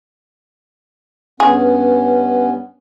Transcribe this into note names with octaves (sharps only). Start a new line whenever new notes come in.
G2 B3 C#4 G#4